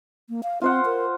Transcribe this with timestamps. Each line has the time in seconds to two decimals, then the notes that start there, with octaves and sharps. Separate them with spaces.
0.29 A#3
0.43 F5
0.62 C4 F4 C5 F#5
0.85 A#4